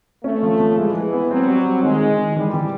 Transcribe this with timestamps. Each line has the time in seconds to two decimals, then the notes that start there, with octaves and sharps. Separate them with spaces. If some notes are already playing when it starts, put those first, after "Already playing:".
0.24 A3 C#4
0.43 F3
0.60 F3
0.77 E3 G#3
0.96 G#3
1.13 B3
1.31 F#3 C4
1.48 G3
1.66 C4
1.83 D#3 G#3
2.01 D#3
2.19 D#3
2.36 E3 G3
2.54 E3